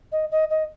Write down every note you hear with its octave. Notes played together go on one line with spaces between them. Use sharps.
D#5
D#5
D#5